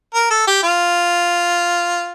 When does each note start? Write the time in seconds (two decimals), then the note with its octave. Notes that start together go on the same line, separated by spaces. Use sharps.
0.14 A#4
0.30 A4
0.47 G4
0.62 F4